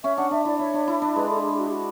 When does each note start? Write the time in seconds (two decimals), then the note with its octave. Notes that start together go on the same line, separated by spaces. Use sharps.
0.04 C#4 E5
0.17 D4 F#5
0.31 D4 E5
0.45 E4 D5
0.59 E4 C#5
0.74 D4
0.88 E4
1.02 D4
1.16 G#3 B4
1.30 A4
1.44 G#4
1.58 F#4
1.67 G#4
1.71 F#4